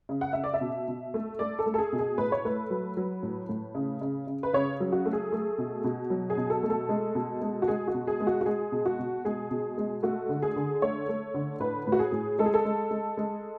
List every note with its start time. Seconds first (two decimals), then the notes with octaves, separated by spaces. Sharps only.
0.09 C#3
0.21 F#5
0.33 C#3 E5
0.44 D5
0.54 E5
0.61 B2
0.88 B2
1.14 A3
1.39 A3 D5
1.59 A4
1.66 A3
1.74 A4
1.78 G#4
1.93 B2
1.99 G#4
2.18 A2 B4
2.32 C#5
2.45 A3 B4
2.70 F#3
2.97 F#3
3.23 A2
3.49 A2
3.75 C#3
4.01 C#3
4.27 C#3
4.43 B4
4.53 C#3 C#5
4.80 F#3
4.92 F#4
5.05 A3
5.13 G#4
5.32 A3
5.58 B2
5.84 B2
6.10 F#3
6.30 G#4
6.37 B2
6.50 A4
6.63 A3
6.70 A4
6.89 G#3
7.15 B2
7.42 G#3
7.62 F#4
7.68 G#3 G#4
7.88 F#4
7.94 B2
8.07 G#4
8.20 G#3
8.27 F#4
8.41 F#4
8.46 G#3 G#4
8.72 B2
8.86 F#4
8.99 B2
9.25 G#3 G#4
9.51 B2
9.78 G#3
10.03 A3 F#4
10.29 D3
10.42 G#4
10.56 D3
10.82 A3 C#5
11.09 A3
11.34 D3
11.60 A2 B4
11.87 A2
11.92 F#4
11.99 G#4
12.12 A2
12.39 G#3 A4
12.46 G#4
12.54 A4
12.65 G#3
12.91 G#3
13.17 G#3